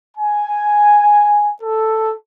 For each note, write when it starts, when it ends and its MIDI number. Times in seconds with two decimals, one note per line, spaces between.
0.17 1.51 80
1.62 2.14 69